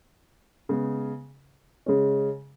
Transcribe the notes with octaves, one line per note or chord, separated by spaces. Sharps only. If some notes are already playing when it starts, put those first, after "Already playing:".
C#3 G#3 B3
C#3 G#3 C#4